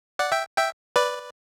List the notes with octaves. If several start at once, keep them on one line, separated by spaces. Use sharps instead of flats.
D5 F#5
E5 G5
E5 G5
B4 D5